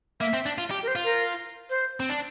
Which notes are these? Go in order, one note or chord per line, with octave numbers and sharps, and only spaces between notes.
A#3 E5
C4
D4
F4
G4
A#4
C5
F4
A#4
C5
C4
D4